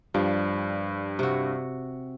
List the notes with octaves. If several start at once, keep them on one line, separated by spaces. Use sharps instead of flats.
G2 F3 G3
C3 F#4